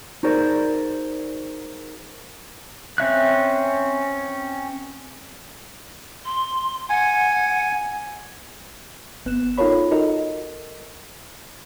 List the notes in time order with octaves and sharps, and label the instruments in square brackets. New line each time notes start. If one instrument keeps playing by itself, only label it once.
[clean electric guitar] D#4 F#4 G#4 A#4 C5 D5
[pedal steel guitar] C4 C#4 E5 F#6
[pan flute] C6
[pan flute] F#5 [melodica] G#5
[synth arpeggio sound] G1 B3 F#6 E7
D#4 F4 A4 A#4 C#5 B5
D#4 F#4 A4 A#4 D#5